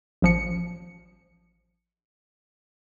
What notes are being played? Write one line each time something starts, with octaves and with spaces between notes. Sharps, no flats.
A1 F3 C#7